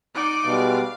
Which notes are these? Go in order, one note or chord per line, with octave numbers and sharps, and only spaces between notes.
D#4 D5 F#5 D6
B2 G3 G#3 F5